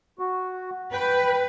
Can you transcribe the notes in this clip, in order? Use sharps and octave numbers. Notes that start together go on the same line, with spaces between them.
F#4
B4 G5